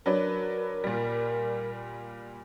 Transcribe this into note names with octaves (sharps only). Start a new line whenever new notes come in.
F#3 D4 A#4 B4
A#2 G3